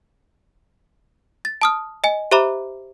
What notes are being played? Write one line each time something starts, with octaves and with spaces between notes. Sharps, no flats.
A6
A5 D#6 F6
D#5 G#5
G4 C5 E5 A#5 B5 D6